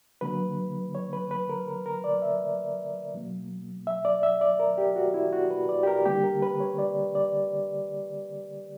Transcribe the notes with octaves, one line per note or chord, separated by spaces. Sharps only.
D3 F#3 A#3 B4
C#5
B4
B4
A#4
A#4
A#4
D5
E5
B2 F#3 A#3
E5
D5
E5
D5
A#4
G4
F#4
E4
F#4
B4
D5
G4
A#4
D3 G3 A#3 G4
A#4
B4
C#5
D5
D5